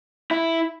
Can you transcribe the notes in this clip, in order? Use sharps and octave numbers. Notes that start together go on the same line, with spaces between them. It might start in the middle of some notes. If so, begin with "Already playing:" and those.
E4